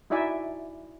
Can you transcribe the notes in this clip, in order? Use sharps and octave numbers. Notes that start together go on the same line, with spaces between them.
D#4 E4 F#4 D5 E5 G#5